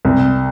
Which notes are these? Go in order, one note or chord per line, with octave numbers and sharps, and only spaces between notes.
C2